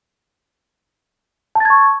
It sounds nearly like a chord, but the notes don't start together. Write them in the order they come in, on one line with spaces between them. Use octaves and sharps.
A5 A6 G#6 C#6